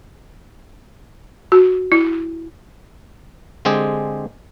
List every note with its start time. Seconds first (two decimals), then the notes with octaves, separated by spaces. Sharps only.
1.52 F#4
1.92 E4
3.65 D3 G#3 C4 G4 G#4